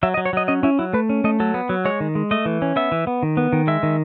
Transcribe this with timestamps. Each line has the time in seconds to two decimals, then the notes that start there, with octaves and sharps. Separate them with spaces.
0.03 F#3 E5
0.14 D#5
0.17 F#3
0.26 C#5
0.33 F#3 D#5
0.48 C#4 D#5
0.63 C#4 E4
0.79 F#3 E4
0.93 A3 B4
1.09 C#4
1.24 A3 D#5
1.40 F#3 A4
1.54 B3
1.69 F#3
1.85 G#3 C#5
2.00 D#3
2.15 G#3
2.31 A3 D#5
2.46 E3
2.62 C#4
2.76 B3 E5
2.92 E3
3.07 B3
3.23 D#3
3.37 B3
3.53 D#3
3.67 G#3 E5
3.83 D#3